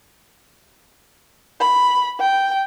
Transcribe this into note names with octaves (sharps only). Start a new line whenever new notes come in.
B5
G5